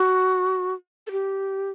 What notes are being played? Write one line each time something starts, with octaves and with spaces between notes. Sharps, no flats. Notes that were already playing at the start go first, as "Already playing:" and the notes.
Already playing: F#4
A4
G4